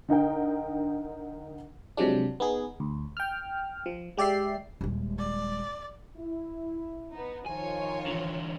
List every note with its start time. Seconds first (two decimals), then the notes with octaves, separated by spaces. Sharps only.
0.08 D3 D#4 A#4 G5
1.97 C3 F3 F#3 G#3 D4
2.40 B3 D#4 G#4
2.80 D2
3.17 G5 F6
3.86 F3
4.17 G#3 G4 D5 E5 C7
4.81 D#1 G#3
5.18 D5
6.17 E4
7.12 B3 D#4
7.46 D#3 F3 D#4 F4 C#5 G#5
8.06 D3 E3